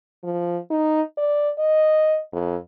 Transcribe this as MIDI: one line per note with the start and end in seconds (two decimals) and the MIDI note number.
0.24 0.58 53
0.70 1.02 63
1.18 1.50 74
1.59 2.19 75
2.33 2.56 41